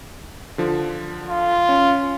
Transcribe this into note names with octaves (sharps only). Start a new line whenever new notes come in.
D3 F3
F4
C#4